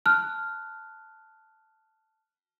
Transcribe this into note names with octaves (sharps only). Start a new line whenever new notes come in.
A5 F6 F#6